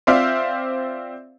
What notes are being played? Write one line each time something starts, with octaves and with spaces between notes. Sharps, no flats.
C4 F4 C5 D5 E5 F5